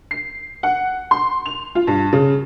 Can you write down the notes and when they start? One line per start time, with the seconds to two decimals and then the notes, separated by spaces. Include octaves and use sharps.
0.11 C7
0.63 F#5
1.11 C6
1.46 F7
1.75 F4
1.87 G2
2.13 C#3